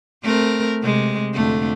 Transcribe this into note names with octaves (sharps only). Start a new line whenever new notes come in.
A3 C4 A#4
C3 G#3
F2 D3 A3